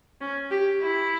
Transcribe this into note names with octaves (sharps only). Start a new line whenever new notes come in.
C#4
G4
E4